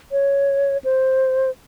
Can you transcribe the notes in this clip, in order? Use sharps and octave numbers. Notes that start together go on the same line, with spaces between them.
C#5
C5